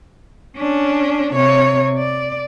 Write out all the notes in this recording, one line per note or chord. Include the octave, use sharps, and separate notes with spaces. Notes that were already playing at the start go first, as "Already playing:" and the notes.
C#4 D4
C3 C#5
D5